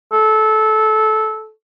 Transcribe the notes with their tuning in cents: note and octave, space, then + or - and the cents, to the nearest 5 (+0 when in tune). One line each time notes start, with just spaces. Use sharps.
A4 -20